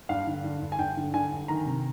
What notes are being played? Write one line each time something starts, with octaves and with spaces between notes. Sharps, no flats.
G2 F5
D3
D3
G2
G#5
G2 G5
D3
D3 G#5
G2
D#3 A#5
C3